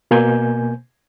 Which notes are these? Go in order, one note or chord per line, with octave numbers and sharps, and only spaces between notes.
B2 A#3 G#5 G6